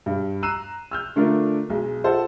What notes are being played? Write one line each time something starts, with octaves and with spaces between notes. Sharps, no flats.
G2
A#5 E6 F#6 C7 D#7 E7
E6 F6 G6
D3 A3 D4 F4 A#4
B1 G#3
F4 A4 C5 F#5